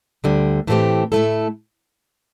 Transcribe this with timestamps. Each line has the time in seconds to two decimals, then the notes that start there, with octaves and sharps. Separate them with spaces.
0.24 D2 D3 G3
0.67 A2 E3 A3 C4 G4
1.12 A2 A3 E4 A4